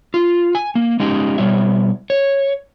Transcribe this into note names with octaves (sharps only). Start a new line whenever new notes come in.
F4
G#5
A#3
G#3 C#4 D#4 G4
B2 G3 E4 C#5 E5
C#5